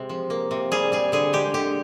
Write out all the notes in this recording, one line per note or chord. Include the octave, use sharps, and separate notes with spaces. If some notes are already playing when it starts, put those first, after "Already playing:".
Already playing: C3 G#3
F3
A#3
C3
G3 G#4
G3 G#4
D3 G#4
G#3 G4
D3 G4